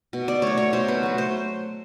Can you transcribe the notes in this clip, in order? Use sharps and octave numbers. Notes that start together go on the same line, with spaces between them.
B2
D5
F#3 A3 C#5
C#5
B2 C5
B4
F#3 A3
C5